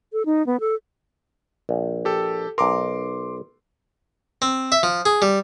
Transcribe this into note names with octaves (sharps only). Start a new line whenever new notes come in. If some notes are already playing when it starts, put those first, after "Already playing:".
A4
D#4
B3
A4
A#1
G4 A4
B1 A#4 C6 D6
C4
E5
F3
G#4
G3